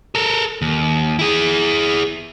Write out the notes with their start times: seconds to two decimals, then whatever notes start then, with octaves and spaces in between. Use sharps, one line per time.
0.15 A4 A#4
0.62 D#2
1.19 E4 G#4